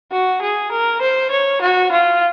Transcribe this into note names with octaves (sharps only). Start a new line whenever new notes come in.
F#4
G#4
A#4
C5
C#5
F#4
F4